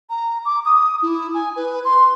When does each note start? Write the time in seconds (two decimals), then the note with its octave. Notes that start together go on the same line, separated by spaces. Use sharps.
0.10 A#5
0.45 D6
0.65 D#6
1.02 E4
1.34 G#5
1.56 B4
1.85 C6